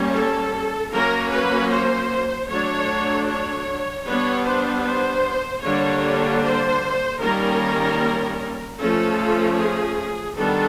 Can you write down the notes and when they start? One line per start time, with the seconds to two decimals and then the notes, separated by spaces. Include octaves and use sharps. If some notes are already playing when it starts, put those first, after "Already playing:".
Already playing: G3 A#3 C#4
0.13 A4
0.92 F#3 A#3 C#4 A#4
1.31 B4
1.71 C5
2.49 F#3 A3 D4 C#5
3.28 C#5
4.07 G3 B3 D4 C#5
4.46 C5
4.85 C5
5.64 D3 G3 A#3 D4 C#5
6.42 C5
7.21 D#3 G3 A#3 C#4 A#4
8.78 F3 A3 C#4 A4
9.58 G#4
10.36 D#3 G3 B3 D4 A4